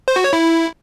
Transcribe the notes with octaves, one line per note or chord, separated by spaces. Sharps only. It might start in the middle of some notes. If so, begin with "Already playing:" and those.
C5
F#4
C#5
E4